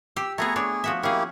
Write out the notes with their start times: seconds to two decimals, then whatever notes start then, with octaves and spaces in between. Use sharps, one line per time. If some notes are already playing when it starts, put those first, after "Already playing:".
0.16 G4 E6
0.38 A3 B3 G#4 G#5 A#5 C#6
0.56 D4 G#4 C#5
0.84 F3 F#4 E5
1.03 A#3 C#4 E4 G4 G#4